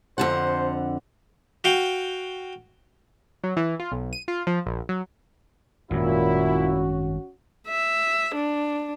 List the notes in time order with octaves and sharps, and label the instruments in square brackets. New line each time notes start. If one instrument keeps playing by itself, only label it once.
[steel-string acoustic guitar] F2 D3 F#5 [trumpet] C5
[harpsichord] F#4 F5 G5
[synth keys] F#3
E3
F4
B1
D#7
F4
F3
A#1
F#3
[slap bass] G#1 F#2 [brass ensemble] A#2 E4 [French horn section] C#4 F#4
[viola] E5
D4